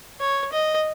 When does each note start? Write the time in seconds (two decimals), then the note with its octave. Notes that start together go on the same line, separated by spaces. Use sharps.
0.20 C#5
0.53 D#5